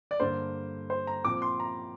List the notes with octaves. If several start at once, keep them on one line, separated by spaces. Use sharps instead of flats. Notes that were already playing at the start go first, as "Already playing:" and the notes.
D5
G2 D3 A#3 C5
C5
A#5
A#2 F3 C4 D6
C6
A#5